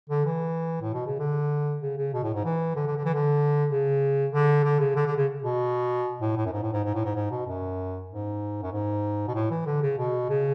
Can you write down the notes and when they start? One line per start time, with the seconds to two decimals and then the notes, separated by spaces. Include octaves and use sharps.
0.09 D3
0.25 E3
0.81 A2
0.94 B2
1.06 C#3
1.19 D3
1.81 C#3
1.98 C#3
2.13 B2
2.23 A2
2.34 G#2
2.44 E3
2.76 D3
2.86 D3
2.97 D3
3.05 E3
3.14 D3
3.70 C#3
4.32 D3
4.64 D3
4.79 C#3
4.95 D3
5.06 D3
5.16 C#3
5.43 B2
6.21 A2
6.36 A2
6.46 F#2
6.52 G#2
6.63 A2
6.73 G#2
6.84 G#2
6.94 A2
7.05 G#2
7.15 G#2
7.31 B2
7.46 F#2
8.09 G#2
8.63 F#2
8.72 G#2
9.28 B2
9.34 A2
9.50 E3
9.66 D3
9.82 C#3
9.98 B2
10.29 C#3